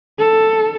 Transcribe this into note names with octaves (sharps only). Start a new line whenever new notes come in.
A4